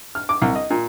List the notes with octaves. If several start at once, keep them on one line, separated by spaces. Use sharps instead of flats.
F6
D6
C2
D#5
A#2